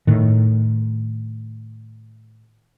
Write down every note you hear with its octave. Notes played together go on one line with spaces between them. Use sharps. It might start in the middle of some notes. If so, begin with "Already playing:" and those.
A2 D#3